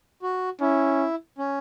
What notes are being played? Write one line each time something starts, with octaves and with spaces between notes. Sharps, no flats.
F#4
C#4 E4
C#4